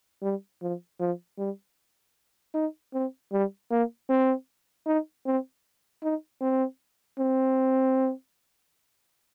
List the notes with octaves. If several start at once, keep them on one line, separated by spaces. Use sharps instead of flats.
G3
F3
F3
G3
D#4
C4
G3
A#3
C4
D#4
C4
D#4
C4
C4